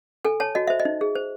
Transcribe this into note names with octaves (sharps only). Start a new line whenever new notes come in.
A4 G#5
C#5 A5
F#4 D#5
C5 E5
D#5
D#4
G#4
C5